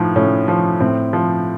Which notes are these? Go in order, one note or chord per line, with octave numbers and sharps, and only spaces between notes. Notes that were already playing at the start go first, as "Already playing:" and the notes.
Already playing: A2 F3 D#4
A2 C#4
F3
A2 C4
F3